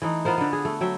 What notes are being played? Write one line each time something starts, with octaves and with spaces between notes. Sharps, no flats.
E3 A3 D#4
B3 F4 A#4 C5
D3 B3
G#4
A3
F#3 E5 G5